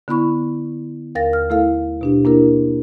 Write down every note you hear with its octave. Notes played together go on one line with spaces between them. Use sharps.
D3 B3 E4 B5 C#6
D#2 A#4 F5 A6 A#6
F6
A3 E4 A4 F5
B2 D4 G4
A#3 D4 E4 A#4